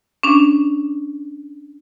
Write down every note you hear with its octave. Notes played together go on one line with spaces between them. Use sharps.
C#4 D4